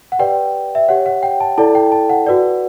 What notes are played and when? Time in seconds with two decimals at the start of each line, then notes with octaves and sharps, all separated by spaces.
0.12 F#5
0.19 G4 B4 D5 G5
0.75 E5
0.88 G4 C#5 F#5
1.06 F#5
1.23 G5
1.40 A5
1.58 E4 A4 D5 A5
1.75 G5
1.92 A5
2.09 F#5
2.27 F#4 B4 D5